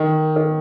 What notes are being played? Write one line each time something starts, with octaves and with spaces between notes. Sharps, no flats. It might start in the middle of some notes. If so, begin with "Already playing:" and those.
Already playing: D#3
D#3